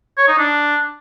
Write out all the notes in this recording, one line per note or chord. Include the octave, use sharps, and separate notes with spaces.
C#5
D#4
D4